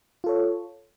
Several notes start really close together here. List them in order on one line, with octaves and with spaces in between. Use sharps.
F4 A4 C#5